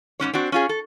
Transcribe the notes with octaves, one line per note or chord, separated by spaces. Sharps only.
G#2 D3 C#4 C#5
C4 D4 F#4
C#4 F4 G#4
A4